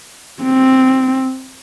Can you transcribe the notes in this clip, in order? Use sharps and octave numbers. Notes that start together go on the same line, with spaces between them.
C4